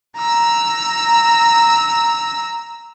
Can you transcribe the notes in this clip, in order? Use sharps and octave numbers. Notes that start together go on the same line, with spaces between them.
A#5 E6